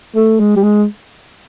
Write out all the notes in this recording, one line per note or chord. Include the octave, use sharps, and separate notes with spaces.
A3
G#3
G3
G#3